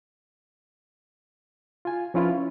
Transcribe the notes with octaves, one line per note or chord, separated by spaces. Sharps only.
F4 G#5
F3 C#4 E4 F4 B4
C#4